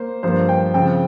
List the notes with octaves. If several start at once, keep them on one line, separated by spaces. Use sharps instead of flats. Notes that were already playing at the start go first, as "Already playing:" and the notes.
Already playing: A#3 C5
G2 F3 A#3 C5
G5
C#3 F3 C4 G5